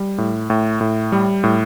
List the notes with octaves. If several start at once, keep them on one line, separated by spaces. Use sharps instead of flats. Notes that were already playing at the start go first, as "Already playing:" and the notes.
Already playing: G3
A2
A2
A2
G3
A2